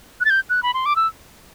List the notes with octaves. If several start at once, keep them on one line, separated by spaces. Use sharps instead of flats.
F#6
A6
G6
F#6
B5
C6
D6
E6